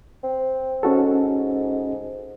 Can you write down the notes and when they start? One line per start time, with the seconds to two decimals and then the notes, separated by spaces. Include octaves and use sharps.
0.23 C4
0.83 G#2 C#4 F#4 A4